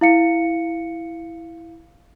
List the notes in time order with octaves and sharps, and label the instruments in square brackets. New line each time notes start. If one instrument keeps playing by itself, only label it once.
[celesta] E4 F5 C#7